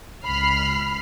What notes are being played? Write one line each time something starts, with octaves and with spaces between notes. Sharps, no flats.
C#2 B5 F6 C7